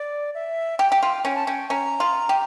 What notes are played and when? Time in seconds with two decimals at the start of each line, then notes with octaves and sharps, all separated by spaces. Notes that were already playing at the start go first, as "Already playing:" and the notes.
Already playing: D5
0.35 E5
0.79 G4 G5
0.92 G4
1.03 F4
1.24 C#4 G5
1.35 A5
1.47 C#4 G5
1.70 C#4 A#5
2.00 F4
2.29 G4